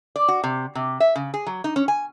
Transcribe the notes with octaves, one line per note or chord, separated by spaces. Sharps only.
D5
F#4
C3
C3
E5
C#3
G#4
F#3
D#4
C#4
G#5